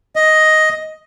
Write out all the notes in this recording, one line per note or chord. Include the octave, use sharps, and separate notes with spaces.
D#5